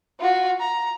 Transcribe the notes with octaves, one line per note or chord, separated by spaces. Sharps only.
F4 F#4
A#5